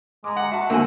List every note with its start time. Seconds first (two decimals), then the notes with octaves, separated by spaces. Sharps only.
0.24 G#3 A#5 D6
0.36 F#5
0.52 F#4 E5 A5 C#6
0.70 E2 G#2 D3 A#3 F#4 E5 G#5